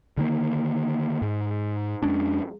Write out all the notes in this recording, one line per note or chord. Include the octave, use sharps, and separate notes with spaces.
D3 D#3 A#3
G#2
F2 G#3 C#4 D4